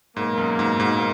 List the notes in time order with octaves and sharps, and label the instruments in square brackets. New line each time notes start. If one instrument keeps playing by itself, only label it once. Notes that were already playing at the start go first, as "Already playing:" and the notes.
[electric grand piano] G#2 [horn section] B2 F#3 A#3
[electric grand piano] F#2
G#2
G#2